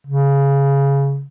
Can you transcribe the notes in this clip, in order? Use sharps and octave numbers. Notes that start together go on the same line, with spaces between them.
C#3